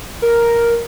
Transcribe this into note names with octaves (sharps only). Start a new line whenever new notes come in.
A#4